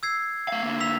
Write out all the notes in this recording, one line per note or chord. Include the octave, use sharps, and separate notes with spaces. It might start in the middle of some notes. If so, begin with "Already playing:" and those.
E6 G#6 C7
A3 F5
D3 A#3
E6 B6 F7